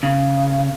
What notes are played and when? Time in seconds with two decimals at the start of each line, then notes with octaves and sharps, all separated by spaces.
0.03 C#3